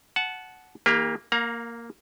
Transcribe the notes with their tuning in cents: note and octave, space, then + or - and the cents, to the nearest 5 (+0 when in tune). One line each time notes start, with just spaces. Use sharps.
F#5 +0 A5 -25
E3 -45 A#3 +0 G4 +35
A#3 -5 F5 +40 A#5 +20